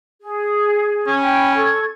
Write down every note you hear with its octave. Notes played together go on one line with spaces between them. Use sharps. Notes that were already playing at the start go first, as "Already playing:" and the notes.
G#4
C#4
G5 B5
A4 C#6 G#6